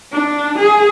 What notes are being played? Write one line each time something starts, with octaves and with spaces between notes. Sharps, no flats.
D4
G#4